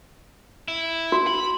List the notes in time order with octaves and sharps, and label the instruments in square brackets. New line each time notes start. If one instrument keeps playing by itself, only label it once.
[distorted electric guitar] E4
[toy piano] F#4
[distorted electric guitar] B5